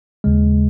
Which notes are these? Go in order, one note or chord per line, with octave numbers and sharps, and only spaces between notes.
D#2 C#3 G#3